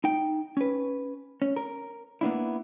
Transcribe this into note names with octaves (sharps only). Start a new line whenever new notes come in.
D#4 G5
C#4 B4
C#4
A#4
A#3 B3 D4 E4